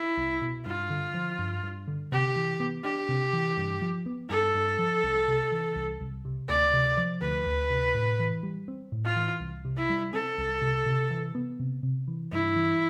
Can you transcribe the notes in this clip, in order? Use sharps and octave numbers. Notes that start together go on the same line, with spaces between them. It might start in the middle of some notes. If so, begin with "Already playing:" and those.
Already playing: E4
C2
B2
G2 F4
D3
F3
G2
G2
D3
C3 G4
E3
B3
D4 G4
C3
E3
G2
F3
B3
G2 A4
G2
F3
C2
C3
E3
C2
C2
C3
D2 D5
C3
F3
D2 B4
D2
C3
A2
E3
G3
C4
A2
F4
E3
C2
C3
E4
G3
C4 A4
C2
C3
C3
E3
B3
C3
C3
E3
G2 E4
E3